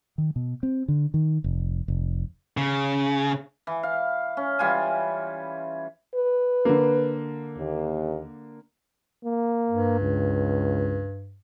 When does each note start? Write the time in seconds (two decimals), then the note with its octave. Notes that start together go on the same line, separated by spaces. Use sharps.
0.18 D#3
0.36 B2
0.63 C4
0.88 D3
1.14 D#3
1.44 F1
1.88 F1
2.57 C#3
3.67 E3
3.83 F5
4.37 C#4
4.59 E3 G3 F4 G#5
6.16 B4
6.65 D3 A#3
7.58 D#2
9.25 A#3
9.69 G2
10.01 C#2